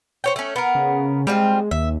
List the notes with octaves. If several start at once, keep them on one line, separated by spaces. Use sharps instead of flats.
C5 C#5 G5
A3 C#4
B3 A#4
C#3
G3 G#3 C4 F4
D#2 E5